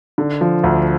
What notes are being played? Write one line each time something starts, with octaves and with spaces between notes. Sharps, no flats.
D3
F3
D2